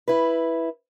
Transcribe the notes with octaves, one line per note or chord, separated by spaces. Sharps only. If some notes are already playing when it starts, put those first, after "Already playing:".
E4 B4